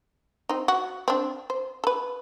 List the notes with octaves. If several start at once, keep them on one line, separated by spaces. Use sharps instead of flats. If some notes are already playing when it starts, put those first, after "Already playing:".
C4 D#4
F#4
C4 D4
C5
A4 B4